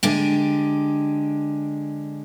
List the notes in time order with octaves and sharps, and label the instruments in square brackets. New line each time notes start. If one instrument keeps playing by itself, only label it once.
[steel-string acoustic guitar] D3 G#3 G4